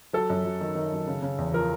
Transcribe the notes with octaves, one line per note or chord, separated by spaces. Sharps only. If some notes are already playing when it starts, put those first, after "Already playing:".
F#3 A4
F#2
F#2
D#3
D#3
F#2
C#3
C#3
E2
F3 A#4